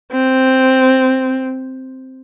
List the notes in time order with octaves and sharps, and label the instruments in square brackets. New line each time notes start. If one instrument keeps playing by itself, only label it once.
[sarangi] C4